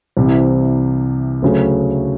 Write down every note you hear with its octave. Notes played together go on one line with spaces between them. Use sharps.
C2 C3 E3
D2 C#3 F#3 A3